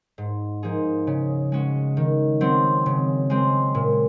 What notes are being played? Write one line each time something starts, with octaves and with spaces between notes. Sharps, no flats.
G#2
F3 A#3 D#4 G#4
C#3
G#3 C#4 F#4
D#3
F#3 C4
C#3
G#3 C4
A#2